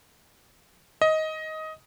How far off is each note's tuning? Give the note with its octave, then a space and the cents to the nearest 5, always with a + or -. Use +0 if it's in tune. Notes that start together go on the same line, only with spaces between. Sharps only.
D#5 +15